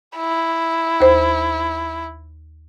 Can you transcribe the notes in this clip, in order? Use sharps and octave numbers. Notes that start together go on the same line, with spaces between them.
E4
D#2 C5